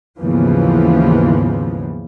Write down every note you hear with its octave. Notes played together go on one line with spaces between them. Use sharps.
D#2 G#2 C#3 E3 F3 B3